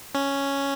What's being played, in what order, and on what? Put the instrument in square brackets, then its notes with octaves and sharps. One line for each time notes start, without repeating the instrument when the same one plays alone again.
[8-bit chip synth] C#4